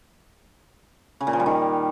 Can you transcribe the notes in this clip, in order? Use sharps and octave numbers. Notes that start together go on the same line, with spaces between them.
C#3
A#2
F3
G3
D#3